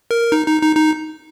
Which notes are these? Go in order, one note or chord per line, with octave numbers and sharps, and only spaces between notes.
A#4
D#4
D#4
D#4
D#4